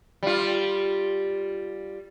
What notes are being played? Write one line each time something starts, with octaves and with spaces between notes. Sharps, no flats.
G3 F4